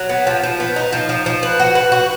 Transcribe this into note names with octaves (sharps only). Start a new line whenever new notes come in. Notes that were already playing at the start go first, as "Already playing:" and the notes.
Already playing: F#3
B3
F3
F3
B3
D#4
F3
F3
F3
B4
F#4
B4
F#4